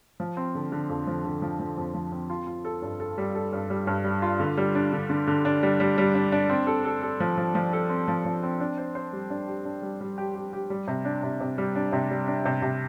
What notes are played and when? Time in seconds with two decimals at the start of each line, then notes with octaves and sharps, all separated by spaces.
0.20 F3
0.37 C4
0.55 D3
0.72 D3
0.89 F2
1.07 F3
1.25 D3
1.42 F3
1.60 F3
1.77 F2
1.94 F3
2.12 C4
2.30 F4
2.47 F4
2.65 A4
2.82 G2
3.00 A4
3.18 G3
3.35 A4
3.52 G2
3.70 G3
3.87 G2
4.04 G3
4.22 F4
4.40 D3
4.57 G3
4.75 D4
4.93 D3
5.10 D3
5.27 D3
5.45 D4
5.63 G3
5.80 G3
5.98 G3
6.15 D4
6.32 D4
6.49 C4
6.67 A4
6.85 A4
7.02 A4
7.20 F3
7.38 F3
7.55 F3
7.73 A4
7.89 C4
8.08 F3
8.25 F3
8.43 C4
8.60 D4
8.77 C5
8.95 C5
9.13 G3
9.30 D4
9.47 G4
9.65 D4
9.82 G3
10.00 G3
10.18 G4
10.35 G4
10.53 G4
10.70 G3
10.88 C3
11.05 D4
11.23 C3
11.40 C3
11.58 G3
11.75 D4
11.93 C3
12.10 G3
12.28 D4
12.45 C3
12.62 C3